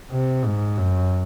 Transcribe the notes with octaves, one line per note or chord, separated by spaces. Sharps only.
C3
G#2
F#2